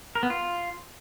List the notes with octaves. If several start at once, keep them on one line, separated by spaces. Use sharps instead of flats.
A#4
B3
F4